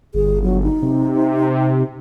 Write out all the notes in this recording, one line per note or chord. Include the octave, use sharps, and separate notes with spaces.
G1 G#4
F#3
D#4
C3